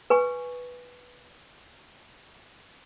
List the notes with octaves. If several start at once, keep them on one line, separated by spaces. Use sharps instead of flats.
B4 G#5 C#6